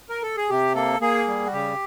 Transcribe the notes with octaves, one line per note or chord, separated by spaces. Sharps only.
A#4
A4
G#4
C3 G4
A#3 A4
A#3 G#4
G3
F#4
C#3 G4